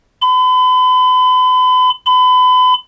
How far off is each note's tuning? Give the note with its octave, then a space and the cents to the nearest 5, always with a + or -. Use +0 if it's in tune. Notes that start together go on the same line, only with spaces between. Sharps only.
B5 +40
B5 +35